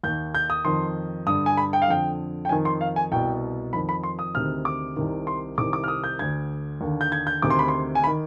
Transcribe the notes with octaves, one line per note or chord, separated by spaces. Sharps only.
D#2 D#3 G6
G6
D#6
F2 D#3 C6
G2 D3 D#6
G#5
B5
G5
F5
F2 D3 G5
G5
F2 D#3 G#5
C6
F5
G#5
C2 B2 G5
F2 D#3 B5
B5
C6
D#6
D2 C3 D#3 F6
D6
C2 C3 D#3
C6
C2 C3 D#3 D6
D6
F6
D#6
G6
D2 D3 G#6
D#2 D3
G6
G#6
G6
D2 C3 D#3 D6
C6
B5
C6
G#5
B5
D#3